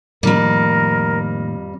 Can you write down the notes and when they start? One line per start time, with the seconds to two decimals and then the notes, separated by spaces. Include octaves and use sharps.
0.23 F2 A2 D#3 G3 A#3 A#4